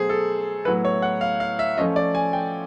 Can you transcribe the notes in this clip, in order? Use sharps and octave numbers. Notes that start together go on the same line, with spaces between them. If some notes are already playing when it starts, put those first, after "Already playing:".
Already playing: B2 F#3 A3 G#4 C5
A4
A2 F#3 B3 E4 B4
C#5
F#5
F5
F5
E5
F3 A3 C#4 F4 D#5
D5
G#5
G5